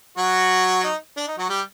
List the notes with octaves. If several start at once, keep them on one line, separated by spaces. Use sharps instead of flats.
F#3 F#4
D#4
D4
D#4
F#3 F#4
G3 G4